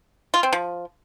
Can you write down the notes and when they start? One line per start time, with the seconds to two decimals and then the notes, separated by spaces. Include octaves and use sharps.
0.34 F4
0.43 C4
0.53 F3